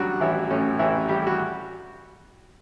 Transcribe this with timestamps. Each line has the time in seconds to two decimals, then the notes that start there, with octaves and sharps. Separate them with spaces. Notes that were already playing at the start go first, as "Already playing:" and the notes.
Already playing: A1 F#3 G3 D4 F#4
0.20 A1 E3 E4
0.51 A2 C#4
0.79 A1 E3 E4
1.08 G3 G4
1.27 F#4